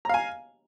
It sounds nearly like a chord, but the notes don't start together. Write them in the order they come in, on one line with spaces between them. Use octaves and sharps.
A#5 F5 G#5